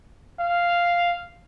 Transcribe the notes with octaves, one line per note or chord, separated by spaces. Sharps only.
F5